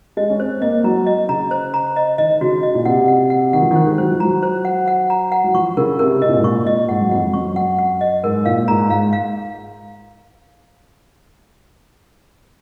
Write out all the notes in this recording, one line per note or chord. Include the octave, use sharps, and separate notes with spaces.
G#3 D#5
C#4
C4 C5
A#3 D#5
F#3 A#5
D#5
C#3 A#5
C5
A#5
D#5
D#3 D#5
C#3 F#4
D#5
A#2
C3 F#5
F#5
F#5
D#3 F#5
F3
D#3 C5
G#3
F#3 C5
F3
F#3 A#5
C5
F#5
F#5
A#5
F#5
F#3
F3 C#6
C#3 A#4
C3 A#4
C3 D#5
A#2
G#2
A#2 C#6
D#5
G#2 F#5
F#2
F2 F#5
F#2 C#6
F#5
F#5
D#5
G#2 A#4
A#2 F5
G#2 A#5
G#2 F5
F5